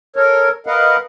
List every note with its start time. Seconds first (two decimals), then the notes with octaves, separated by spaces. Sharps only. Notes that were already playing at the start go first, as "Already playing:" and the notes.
0.16 A4 A#4 C#5
0.67 A#4 B4 D#5 F5 F#5